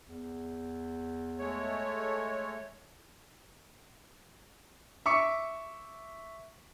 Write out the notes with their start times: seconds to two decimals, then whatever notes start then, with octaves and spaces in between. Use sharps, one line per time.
0.08 E2
1.38 G#3 A3 C#5
5.06 E5 C#6 D6 C#7